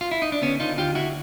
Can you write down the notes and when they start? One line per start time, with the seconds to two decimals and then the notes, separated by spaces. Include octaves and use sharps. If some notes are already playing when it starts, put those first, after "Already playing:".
0.01 F4
0.11 E4
0.22 D#4
0.32 D4
0.42 D3 B3 C#4
0.60 D3 D#4 F4
0.78 D2 F4 G4
0.95 D2 E4 F#4